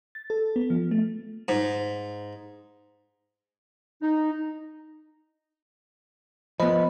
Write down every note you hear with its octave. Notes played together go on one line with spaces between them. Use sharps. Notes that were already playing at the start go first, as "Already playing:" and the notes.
A6
A4
B3
F3
A3
G#2
D#4
F3 B3 C5 D#5 B5